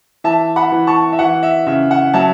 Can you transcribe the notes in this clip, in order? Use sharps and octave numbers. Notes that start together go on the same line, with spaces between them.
E3 E5 A5
F#5 B5
E3
A5 C#6
E5
E3 F#5
E5
C#3 E5
F#5
F#3 E5 A5